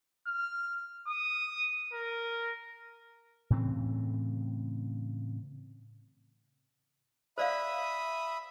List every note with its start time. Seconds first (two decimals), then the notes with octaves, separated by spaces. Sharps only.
0.27 F6
1.08 D#6
1.94 A#4
3.50 A2 C#3 E3 C4
7.38 C5 D5 E5 F5 B5 D#6